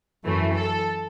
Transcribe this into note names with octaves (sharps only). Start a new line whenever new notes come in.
F#2 E3 A3
A4